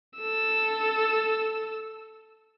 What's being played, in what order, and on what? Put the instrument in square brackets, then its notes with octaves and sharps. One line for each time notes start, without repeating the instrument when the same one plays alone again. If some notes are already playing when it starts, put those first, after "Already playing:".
[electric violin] A4 E6